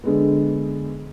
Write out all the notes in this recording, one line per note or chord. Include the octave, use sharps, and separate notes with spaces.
D3 G#3 B3